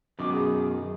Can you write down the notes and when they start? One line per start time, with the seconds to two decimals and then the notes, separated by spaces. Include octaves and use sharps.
0.19 F#2 B2 D#3 D6
0.32 G#4